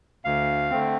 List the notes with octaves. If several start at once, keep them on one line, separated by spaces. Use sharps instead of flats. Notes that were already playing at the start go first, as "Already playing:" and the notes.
D2 F5
D3 A3 C4